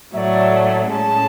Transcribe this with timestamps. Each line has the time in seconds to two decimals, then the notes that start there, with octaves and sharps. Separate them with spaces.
0.13 A2 F#3 A3 D5 E5
0.89 A2 G#3 C#4 A5